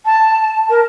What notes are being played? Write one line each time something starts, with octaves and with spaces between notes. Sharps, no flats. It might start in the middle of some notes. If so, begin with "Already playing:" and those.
A5
A#4